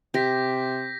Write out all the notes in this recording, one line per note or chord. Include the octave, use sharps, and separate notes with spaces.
C3 G4 G6 A#6 B6